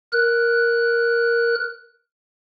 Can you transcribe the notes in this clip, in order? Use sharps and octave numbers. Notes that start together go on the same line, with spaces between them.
A#4 F#6